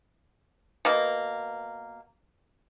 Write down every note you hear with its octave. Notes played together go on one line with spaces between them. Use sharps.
B2 A#3